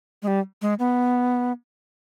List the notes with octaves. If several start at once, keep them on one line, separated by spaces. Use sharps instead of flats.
G#3
G3
G#3
B3